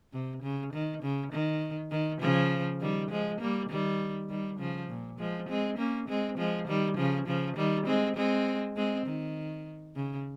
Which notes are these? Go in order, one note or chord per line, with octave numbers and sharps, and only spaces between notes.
C3
C#3
D#3
C#3
D#3
D#3
C#3 F3
D#3 G3
F3 G#3
G3 A#3
D#3 G3
D#3 G3
C#3 F3
A#2
F3 G#3
G#3 C4
A#3 C#4
G#3 C4
F3 G#3
D#3 G3
C#3 F3
C#3 F3
D#3 G3
G#3 C4
G#3 C4
G#3 C4
D#3
C#3